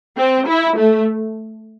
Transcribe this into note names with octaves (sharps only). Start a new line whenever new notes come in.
C4
E4
A3